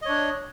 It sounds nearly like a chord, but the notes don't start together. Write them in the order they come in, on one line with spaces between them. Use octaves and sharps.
D#5 C#5 D4